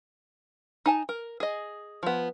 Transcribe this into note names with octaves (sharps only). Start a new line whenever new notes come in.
D#4 G#5 A5
A#4
G#4 D#5
F3 B3